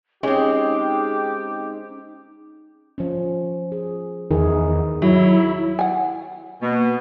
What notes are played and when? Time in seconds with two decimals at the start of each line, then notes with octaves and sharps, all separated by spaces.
0.23 G#3 C4 C#4 D#4 G4
2.98 F3 C#4
3.72 G#4
4.31 E2 D#3 D#4 G#4
5.02 F#3 E4
5.79 F#5 G#5
6.62 B2 A#3